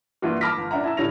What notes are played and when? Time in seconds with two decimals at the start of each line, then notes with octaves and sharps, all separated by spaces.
0.22 G2 E3 A#3 F4 F#4
0.41 A5 B5 D6 F6 A#6 B6
0.57 G1
0.71 C#4 D4 E5 F#5 A#5
0.84 E4 A5 E6
0.97 A2 D3 G3 C#5 A#6 F7